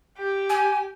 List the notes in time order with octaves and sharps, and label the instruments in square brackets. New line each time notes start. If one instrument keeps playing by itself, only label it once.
[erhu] G4
[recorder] G#5